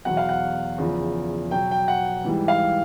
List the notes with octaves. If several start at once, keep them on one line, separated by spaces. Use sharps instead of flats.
E2 B2 F#3 F#5
F5
F#5
E2 C#3 F3
B2 F#3 G5
G5
F#5
G#2 E3 G3
F5